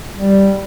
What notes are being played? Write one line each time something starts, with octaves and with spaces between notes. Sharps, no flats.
G3